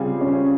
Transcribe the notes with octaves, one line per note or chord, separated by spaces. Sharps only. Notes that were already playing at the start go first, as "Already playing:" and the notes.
Already playing: C#3 G3 C4 F4 G#4
C#4